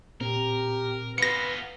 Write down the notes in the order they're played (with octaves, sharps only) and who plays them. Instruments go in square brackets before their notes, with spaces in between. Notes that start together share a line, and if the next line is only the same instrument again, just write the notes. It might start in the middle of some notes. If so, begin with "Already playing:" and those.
[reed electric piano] A#2 C4 [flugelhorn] G4 [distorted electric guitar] A#4
[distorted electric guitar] B3 F4 [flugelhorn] B4 [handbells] A#6 C#7